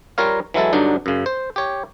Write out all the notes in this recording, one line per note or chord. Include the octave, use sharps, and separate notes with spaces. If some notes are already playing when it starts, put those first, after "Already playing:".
G3 F4 A#4 C#5 F5
E3 F#3 G#3 E4 A4
G2 D3 F#3 D4 D#4
F#2 C#3
C5
G4 C#5